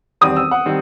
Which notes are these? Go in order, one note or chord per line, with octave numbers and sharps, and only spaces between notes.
E2 D#3 G3 C4 D#6
E6
F#5
D#3 G3 C4